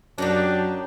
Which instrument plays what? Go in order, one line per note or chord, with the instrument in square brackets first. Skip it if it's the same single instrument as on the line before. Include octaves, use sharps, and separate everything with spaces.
[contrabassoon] F#2 [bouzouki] F#3 D#4 G4 [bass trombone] D4